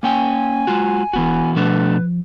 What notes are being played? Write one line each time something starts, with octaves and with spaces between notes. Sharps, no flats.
A#3 C#4 G5 G#5
G#3 F4 F#4
D1 E3 B3 F#4
B2 F3 A3 D4 B4